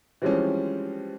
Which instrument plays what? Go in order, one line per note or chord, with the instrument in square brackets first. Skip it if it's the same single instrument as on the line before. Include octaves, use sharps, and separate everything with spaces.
[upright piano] E3 F3 G3 G#3 C4 C#4